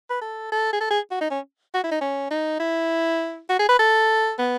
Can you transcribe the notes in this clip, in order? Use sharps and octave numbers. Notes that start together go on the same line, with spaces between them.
B4
A4
A4
G#4
A4
G#4
F#4
D#4
C#4
F#4
E4
D#4
C#4
D#4
E4
F#4
G#4
B4
A4
B3